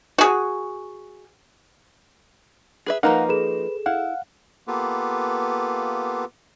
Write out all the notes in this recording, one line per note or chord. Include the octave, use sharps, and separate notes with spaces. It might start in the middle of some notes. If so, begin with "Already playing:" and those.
F#4 G#4
G#4 B4 E5
F3 A#3 D#4 A#4 B4 F5 F#5 A#5
G#4 A4 B4 E7
E4 F5 F#5
A#3 B3 F4 G4 A4 B4